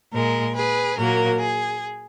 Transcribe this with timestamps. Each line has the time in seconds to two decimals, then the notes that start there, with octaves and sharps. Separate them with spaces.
0.13 A#2 G#3 A#4
0.55 G#4 B4
0.97 A#2 F#3 A#3 A#4
1.40 G#4